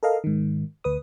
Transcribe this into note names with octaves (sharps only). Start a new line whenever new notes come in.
A4 A#4 D#5 F5
G#2 D#3
D2 B4 D#6